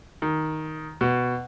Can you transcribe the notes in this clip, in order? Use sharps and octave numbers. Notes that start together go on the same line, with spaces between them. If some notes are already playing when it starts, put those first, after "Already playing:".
D#3
B2